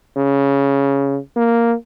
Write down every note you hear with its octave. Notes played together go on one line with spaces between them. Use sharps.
C#3
A#3